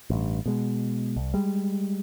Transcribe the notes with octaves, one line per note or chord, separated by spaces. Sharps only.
A1 G2
B2 G#3
C2
G3 G#3